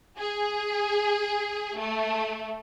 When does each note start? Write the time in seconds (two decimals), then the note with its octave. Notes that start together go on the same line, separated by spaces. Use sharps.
0.18 G#4
1.78 A3